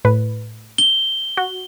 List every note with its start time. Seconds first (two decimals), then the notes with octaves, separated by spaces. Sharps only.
0.05 A2 B4
0.78 G7
1.37 F#4